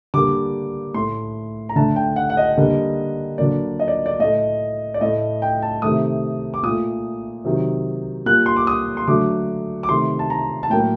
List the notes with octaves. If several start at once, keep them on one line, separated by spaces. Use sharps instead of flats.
D3 G3 A#3 D6
A2 A3 C6
A#5
D3 A3 A5
G5
F#5
F#5
D#5
D3 G3 A#3
D3 F#3 A#3 D5
D#5
D5
D5
A2 A3 D#5
D5
A2 A3 D#5
G5
A5
C3 D#3 A3 D#6
D6
A#2 A3 D#6
C3 D#3 F#3
A#2 G3 A#3 F#6
C6
D6
D#6
C6
D3 F#3 A3 D6
D6
C3 D#3 A3 C6
A5
A#5
A5
A2 F#3 A#3 G5